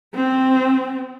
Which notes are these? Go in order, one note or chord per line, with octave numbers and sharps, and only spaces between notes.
C4